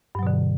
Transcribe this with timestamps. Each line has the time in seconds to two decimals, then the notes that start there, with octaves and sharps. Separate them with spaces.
0.15 G2
0.19 F#3
0.23 B2
0.27 D3